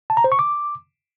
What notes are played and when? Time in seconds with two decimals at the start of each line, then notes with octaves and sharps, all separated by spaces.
0.10 A5
0.17 A#5
0.24 C5
0.32 C#6
0.39 D6